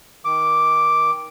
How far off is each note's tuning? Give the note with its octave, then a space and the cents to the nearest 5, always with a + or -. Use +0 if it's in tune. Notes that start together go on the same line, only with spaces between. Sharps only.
D#3 +20 D6 +0